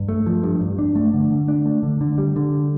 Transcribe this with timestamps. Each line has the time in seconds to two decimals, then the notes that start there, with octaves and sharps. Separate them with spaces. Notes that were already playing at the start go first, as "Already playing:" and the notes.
Already playing: G2
0.09 A3
0.26 F3
0.43 G2
0.61 G2
0.79 D4
0.95 A3
1.14 D3
1.31 D3
1.48 D4
1.66 A3
1.83 D3
2.01 D3
2.18 G3
2.36 D3